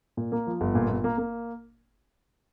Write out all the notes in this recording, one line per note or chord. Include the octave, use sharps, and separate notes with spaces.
A#2
A#3
F3
G1
A#2
A#2
A#3
A#3